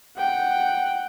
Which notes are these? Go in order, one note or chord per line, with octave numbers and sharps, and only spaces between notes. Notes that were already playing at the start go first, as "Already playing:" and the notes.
F#5 G5